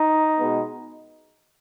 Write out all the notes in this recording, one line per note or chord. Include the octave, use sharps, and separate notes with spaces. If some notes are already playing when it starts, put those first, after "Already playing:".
Already playing: D#4
B2 G#3 B3